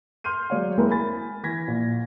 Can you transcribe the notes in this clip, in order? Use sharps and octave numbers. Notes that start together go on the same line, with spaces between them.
C6 F6 G6 D#7
F#3 G#3 C#5 D5 F5
G#3 A#3 C4 E4 A#4
G#5 B5 A6
E3 G#6 A#6 B6
A#1